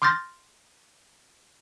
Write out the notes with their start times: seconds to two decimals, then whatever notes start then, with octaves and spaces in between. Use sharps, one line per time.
0.02 C6 D6 F6 G6 A6 A#6